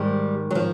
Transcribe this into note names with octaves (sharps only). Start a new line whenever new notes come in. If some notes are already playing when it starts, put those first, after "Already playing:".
Already playing: G#2 D#3 G3
F#3
F3